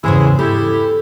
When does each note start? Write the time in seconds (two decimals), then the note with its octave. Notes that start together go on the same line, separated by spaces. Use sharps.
0.04 E2 G#2 C#3 G#3 E4 G#4
0.39 E4 G4 A4